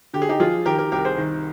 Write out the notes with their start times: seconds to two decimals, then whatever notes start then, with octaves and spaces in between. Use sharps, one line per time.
0.13 D3 G4
0.22 G#4
0.29 D#4 G4
0.40 F3 F4 G#4
0.66 D#3 G4 A#4
0.79 G4 A#4
0.92 C2 G4 A#4
1.05 G#4 C5
1.18 D#3